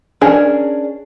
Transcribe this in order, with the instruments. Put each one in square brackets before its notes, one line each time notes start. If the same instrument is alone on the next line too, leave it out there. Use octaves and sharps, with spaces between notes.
[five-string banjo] C#4 D4 G#4 A#4 D#5